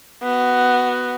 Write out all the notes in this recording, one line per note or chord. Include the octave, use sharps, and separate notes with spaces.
B3 F#4